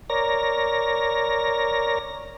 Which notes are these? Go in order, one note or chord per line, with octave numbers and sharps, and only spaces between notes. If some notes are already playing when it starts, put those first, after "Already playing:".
A#4 C#5 D5 A#5 A#6